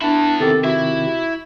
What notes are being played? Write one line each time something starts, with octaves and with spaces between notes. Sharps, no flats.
B3 D4 E4
C3 D#3 G4 A4
E4 F#4 E5